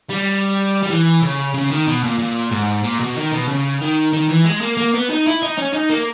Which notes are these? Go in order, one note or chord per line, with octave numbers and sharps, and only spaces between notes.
G3
G3
E3
C#3
C#3
D#3
B2
A#2
A#2
G#2
A#2
B2
D#3
B2
C#3
D#3
D#3
E3
G#3
A#3
A#3
B3
D#4
E4
D#4
C#4
D#4
A#3